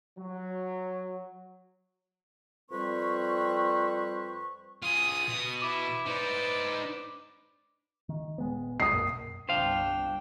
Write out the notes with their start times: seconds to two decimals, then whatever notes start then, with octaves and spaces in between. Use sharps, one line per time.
0.19 F#3
2.70 F2 G3 C4 B4 C5 C#6
4.83 F4 G#4 D#6
5.29 B2
5.62 E4 D6
6.06 D#4 B4 C5 D5
8.09 D#3
8.38 D#1 G#3 B3
8.80 B1 D#6 C7
8.92 B1 F#2 A#3
9.49 G1 C2 G3 D4 C5 F5 G5